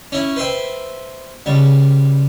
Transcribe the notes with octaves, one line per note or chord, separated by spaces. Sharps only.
C#4 E4
B4 C5 E5 G5
C#2 G3